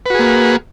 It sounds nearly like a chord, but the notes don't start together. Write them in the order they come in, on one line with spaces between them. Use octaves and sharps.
B4 F#4 G#4 A#3